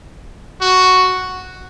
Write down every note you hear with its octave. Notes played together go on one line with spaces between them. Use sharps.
F#4